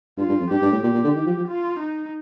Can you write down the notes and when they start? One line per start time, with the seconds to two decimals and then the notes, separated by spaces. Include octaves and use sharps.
0.18 G2 F4
0.29 G2
0.40 F2
0.51 G2 G4
0.62 G2
0.72 A2
0.83 A#2 G4
0.94 A#2
1.04 D3
1.16 D#3
1.26 F3
1.37 F3
1.48 F4
1.79 D#4